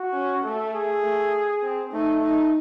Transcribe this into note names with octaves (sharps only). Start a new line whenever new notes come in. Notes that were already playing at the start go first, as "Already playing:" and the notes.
Already playing: F#4
C#4
A3 A4
G#4
A3
C4
A3 D#4
D#4